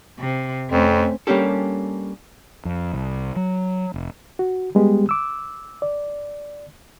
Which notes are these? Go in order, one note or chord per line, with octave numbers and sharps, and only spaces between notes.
C3
F2 A3 C4 C#4
G3 A#3 C#4 D4 G4 A4
F2
C2
F#3
F1
F#4
G3 G#3 B3 G4
D6 E6
D5